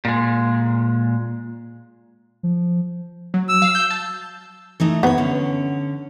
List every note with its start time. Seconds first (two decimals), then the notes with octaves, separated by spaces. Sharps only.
0.05 A#2 G#3
2.43 F3
3.34 F#3
3.49 E6
3.62 F5
3.75 G6
3.91 A5
4.80 E3 A3 D#4
5.03 B3 C5 C#5
5.18 D3 C#4